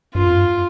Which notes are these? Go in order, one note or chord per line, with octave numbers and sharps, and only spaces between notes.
G2 F4
F2
G2